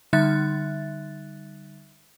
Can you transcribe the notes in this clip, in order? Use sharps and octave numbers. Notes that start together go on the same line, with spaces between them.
D3 G3 D#4 E5 F#6 A6